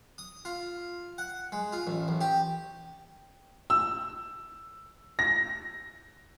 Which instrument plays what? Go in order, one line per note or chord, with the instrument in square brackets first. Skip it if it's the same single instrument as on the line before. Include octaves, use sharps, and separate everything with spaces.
[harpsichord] D#6
F4
F#5
G#3
F4
A1
A1
G4
[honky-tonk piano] E6
A#6